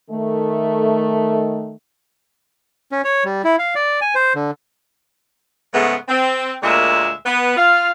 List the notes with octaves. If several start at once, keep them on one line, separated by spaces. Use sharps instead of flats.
D#3 A3
C#4
C#5
G3
E4
F5
D5
G#5
C5
D3
G#2 C#3 A3 B3
C4
D2 A#2 G#3 A#3 E5
B3
F4 F5